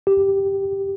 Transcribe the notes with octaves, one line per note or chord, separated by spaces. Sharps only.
G4